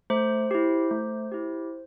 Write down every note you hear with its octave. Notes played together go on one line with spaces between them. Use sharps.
A3 C5
E4 G4
A3
E4 G4